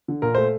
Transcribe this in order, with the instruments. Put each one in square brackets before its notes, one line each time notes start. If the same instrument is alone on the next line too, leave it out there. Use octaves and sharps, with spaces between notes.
[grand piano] D3
A#2 A#4
A3 C5